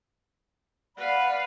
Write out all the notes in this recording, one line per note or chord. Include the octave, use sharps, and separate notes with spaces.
B4 D5 F5 F#5 B5